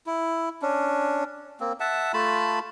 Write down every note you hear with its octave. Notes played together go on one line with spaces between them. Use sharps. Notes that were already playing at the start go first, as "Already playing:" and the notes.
E4
C#4 D4
A#3 C4
E5 F#5 A5
A3 F4 A5 B5